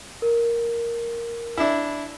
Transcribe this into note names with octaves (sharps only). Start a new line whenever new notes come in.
A#4
D4 E4